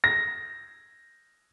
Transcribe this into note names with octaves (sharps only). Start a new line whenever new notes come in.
A#6